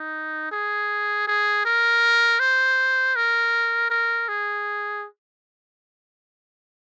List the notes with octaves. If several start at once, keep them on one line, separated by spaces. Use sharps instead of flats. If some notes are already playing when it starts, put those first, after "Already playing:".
Already playing: D#4
G#4
G#4
A#4
C5
A#4
A#4
G#4